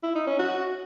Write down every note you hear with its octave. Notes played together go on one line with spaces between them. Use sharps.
E4
D#4
C#4
F#4